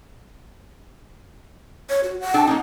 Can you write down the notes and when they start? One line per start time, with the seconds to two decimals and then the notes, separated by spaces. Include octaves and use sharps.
1.90 C#5
2.04 F#4
2.20 F#5
2.34 D4 A4 G5
2.47 A#3 C#4 D#4